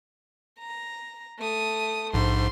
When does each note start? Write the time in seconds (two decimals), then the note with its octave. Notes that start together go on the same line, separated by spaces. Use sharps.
0.59 A#5
1.39 A3 D#6
2.14 A#1 G#2 C6